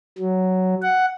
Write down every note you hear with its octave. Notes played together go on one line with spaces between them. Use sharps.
F#3
F#5